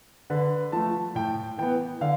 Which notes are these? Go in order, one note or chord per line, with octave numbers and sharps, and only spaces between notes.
D3 B4
F3 A3 A5
A2 G5
E3 B3 G5
D3 F5